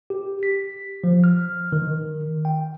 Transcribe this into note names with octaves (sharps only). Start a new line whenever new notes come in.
G4
B6
F3
F6
D#3
G5